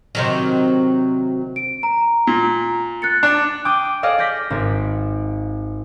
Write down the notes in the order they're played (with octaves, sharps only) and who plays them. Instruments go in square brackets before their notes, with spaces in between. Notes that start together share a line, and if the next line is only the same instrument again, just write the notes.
[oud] C3 D#3 F#3
[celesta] D7
A#5
[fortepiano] A#2
[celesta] F#6 A6 C#7
[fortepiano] D4 [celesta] F#6
[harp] G5 D6 D#6
G#4 A4 D5 D#5 F5
D5 D6 G6 A#6 B6
G#1